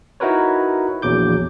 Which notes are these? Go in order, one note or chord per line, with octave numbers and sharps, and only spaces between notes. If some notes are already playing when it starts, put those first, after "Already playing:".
D#4 E4 F#4 A#4 B4 C#5
A#1 E2 F#3 D6 G6